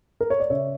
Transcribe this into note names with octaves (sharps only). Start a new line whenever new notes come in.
A#4
C#5
D5
C#3 C#5 E5